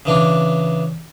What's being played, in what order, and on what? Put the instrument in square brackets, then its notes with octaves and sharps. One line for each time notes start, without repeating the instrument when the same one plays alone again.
[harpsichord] C#3 E3 D4